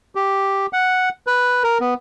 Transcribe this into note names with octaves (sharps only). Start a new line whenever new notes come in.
G4
F#5
B4
A#4
B3